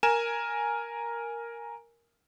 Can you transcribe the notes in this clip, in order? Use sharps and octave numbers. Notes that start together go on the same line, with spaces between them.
A#4 G#5 E7